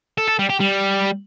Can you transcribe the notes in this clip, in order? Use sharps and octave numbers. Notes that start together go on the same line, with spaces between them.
A4
A4
G3
G4
G3